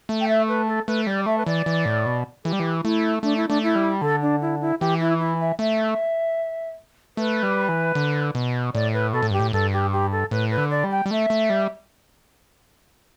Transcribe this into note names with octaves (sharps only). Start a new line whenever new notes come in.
A3
G5
E5
B4
A4
A3 B4
G3 D5
A3 E5
B4
E3 D5
E3
A2
B2
E3 A4
G3 G4
E3
A3 E4
A3 D4
E4
A3 D4
E4
G3
D3 A4
D4
E4
E4
E3 G4
E4
E4
E5
A3 E5
A3 B4
G3
E3
D3
B2
A2 D5
B4
B2 A4
A2
G2 G4
A2
G2 A4
G4
G4
A4
A2 B4
B4
D3
D5
G3
G5
G3
A3 E5
A3
G3